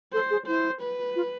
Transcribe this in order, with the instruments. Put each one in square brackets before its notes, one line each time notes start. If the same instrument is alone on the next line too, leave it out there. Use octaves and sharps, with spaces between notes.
[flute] A4 [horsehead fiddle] C5
[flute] G#4
[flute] E4 [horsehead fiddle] C5
[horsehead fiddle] B4
[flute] F4